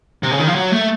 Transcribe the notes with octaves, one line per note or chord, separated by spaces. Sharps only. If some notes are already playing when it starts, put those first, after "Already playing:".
C3
C#3
D#3
F3
F#3
A3